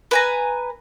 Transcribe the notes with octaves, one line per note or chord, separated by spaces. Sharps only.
B4 G#5 A#5